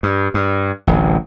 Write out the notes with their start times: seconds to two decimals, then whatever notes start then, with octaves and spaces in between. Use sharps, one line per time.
0.03 G2
0.34 G2
0.87 D1 A1